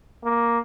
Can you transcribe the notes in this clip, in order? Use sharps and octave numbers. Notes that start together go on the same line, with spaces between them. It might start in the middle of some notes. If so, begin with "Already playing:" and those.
A#3